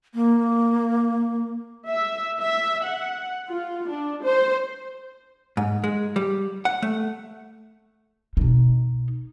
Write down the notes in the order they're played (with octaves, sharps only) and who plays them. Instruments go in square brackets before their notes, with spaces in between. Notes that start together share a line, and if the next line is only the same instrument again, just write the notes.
[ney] A#3
[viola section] E5
E5
F#5
F4
D4
C5
[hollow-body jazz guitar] G#2
G#3
G3
F#5
A3
[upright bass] B2 D#4